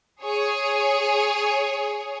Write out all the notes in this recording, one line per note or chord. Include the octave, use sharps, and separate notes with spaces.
G#4 C#5